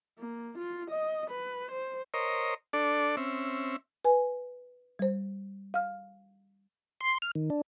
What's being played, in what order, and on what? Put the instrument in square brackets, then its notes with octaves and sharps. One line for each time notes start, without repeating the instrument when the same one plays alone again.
[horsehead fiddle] A#3
F4
D#5
B4
C5
[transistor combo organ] A#4 C5 C#5 D#5
D4 A4 D5
C4 C#4 E5
[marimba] B4 G#5
G3 C5
F5 F6
[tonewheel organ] C6
F6
D#3
D4